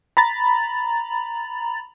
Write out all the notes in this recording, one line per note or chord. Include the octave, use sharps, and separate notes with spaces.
A#5 B5 A6